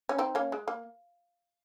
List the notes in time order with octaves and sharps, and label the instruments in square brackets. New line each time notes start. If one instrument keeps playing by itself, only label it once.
[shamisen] C#4
C4 D#4
A#3 C#4
G#3
A#3